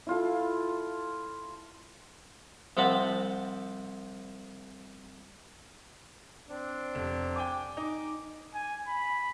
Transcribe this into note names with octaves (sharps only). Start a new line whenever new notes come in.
E4 F4 A4
C2 F3 C4 F#5 A5 B5
C4 D4
F1
G5 G#5 D6
D#4 D6
G#5
B5